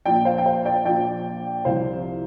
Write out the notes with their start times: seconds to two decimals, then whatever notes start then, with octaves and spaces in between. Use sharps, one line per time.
0.06 A#1 A#2 F3 D5 G5
0.25 C5 F5
0.38 G5
0.46 C5 F5
0.65 D5 G5
0.85 A#1 A#2 F3 D5 G5
1.65 C2 C3 F3 C5 F5